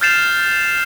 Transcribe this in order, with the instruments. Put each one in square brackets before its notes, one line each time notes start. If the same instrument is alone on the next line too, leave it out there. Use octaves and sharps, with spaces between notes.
[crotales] F6 G6 A6 C7 E7 F7